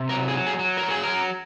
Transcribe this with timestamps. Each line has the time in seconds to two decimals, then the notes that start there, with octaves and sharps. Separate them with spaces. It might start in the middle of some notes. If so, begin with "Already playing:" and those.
Already playing: C3
0.09 F#3 A#4
0.28 G#4
0.34 F#3
0.47 G#4
0.59 F#3
0.77 A#4
0.83 F#3
0.90 G#4
1.03 F#3 A#4